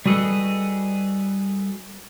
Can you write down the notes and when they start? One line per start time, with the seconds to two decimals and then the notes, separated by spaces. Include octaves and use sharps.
0.06 G3 F#4 G#4 A4 B4 D#5